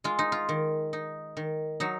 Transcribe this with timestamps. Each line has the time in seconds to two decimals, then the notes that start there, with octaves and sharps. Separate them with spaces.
0.04 G#3 F4
0.19 D#4
0.32 F4
0.49 D#3
0.93 D#4
1.37 D#3
1.80 F#3 D#4